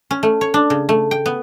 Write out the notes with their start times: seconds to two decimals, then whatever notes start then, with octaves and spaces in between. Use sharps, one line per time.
0.11 C#4
0.23 A3
0.41 C#5
0.54 D4
0.70 C#3
0.89 A3
1.11 G5
1.26 B3